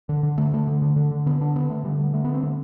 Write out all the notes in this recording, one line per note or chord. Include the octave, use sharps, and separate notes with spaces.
D3
D3
D3 A3
D3 A3
D3
D3
D3
D3
D3 B3
D3 D4
D3 B3
D3 A3
D3 G3
D3
D3 A3
B3
D3
C4
D3